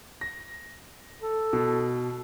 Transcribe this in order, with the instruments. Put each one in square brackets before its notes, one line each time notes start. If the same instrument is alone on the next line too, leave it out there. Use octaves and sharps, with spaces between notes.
[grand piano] A#6
[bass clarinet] A4
[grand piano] B2